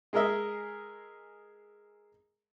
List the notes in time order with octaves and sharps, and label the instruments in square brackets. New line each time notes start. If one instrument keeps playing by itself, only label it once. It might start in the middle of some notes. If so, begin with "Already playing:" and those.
[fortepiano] G#3 G#4 A#4 D#5 E5